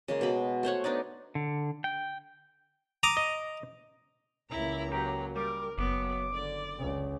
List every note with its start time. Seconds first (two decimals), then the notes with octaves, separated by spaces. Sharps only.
0.08 C#3 G#3 A#3
0.21 B2 G#3 B5
0.63 A3 C5 C#5 F#5
0.84 B3 D4 D#4 D5
1.35 D3
1.84 G5
3.03 A#5 D6 D#6
3.17 D#5
4.50 C#2 A#3 E4 A#5
4.92 F#3 G4 A#5
5.36 G3 A#4 D6
5.77 F#1 F#3 B3 D6
6.34 D3 D5
6.79 C#2